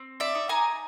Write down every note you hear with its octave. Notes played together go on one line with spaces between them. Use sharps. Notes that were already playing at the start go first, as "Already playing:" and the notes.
Already playing: C4
D5 E5
D#4
G#5 A#5